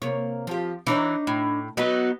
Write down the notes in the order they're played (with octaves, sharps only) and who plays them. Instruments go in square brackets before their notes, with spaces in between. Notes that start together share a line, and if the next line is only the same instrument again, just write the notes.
[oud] C3 A#3 C#5
F3 G4
[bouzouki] E3 [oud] D4 D#4 C#5
[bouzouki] A2
[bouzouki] F#3 D#4 F#4 [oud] B3 B4